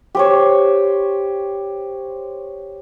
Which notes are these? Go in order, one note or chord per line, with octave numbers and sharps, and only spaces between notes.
G4 C5 C#5